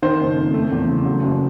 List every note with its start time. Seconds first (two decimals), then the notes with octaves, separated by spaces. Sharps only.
0.02 D#3 C5
0.20 F#1
0.37 F2
0.54 A3
0.72 E2
0.88 C#3
1.05 F#3
1.23 F#1